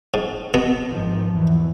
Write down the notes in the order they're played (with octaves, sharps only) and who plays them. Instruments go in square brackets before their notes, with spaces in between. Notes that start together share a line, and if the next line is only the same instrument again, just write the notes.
[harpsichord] G#2
B2 B3
[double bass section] G#1 D#3 F3
E2 E3